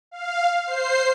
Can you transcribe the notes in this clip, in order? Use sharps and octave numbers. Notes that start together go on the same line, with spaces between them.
F5
C5 C7